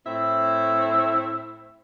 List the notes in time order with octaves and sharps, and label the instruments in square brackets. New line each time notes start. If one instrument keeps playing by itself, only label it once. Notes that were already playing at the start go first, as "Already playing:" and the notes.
[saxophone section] A2 C4 E4 E5